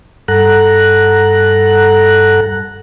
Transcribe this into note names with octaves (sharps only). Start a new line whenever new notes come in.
G2 A4 F#5 A#5 F#6